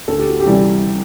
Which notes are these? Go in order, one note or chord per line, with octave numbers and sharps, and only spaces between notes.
D2 A4
G4
F#4
G4
C3 E3 G3